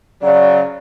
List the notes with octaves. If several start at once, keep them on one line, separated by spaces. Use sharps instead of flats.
C#3 F#3 D5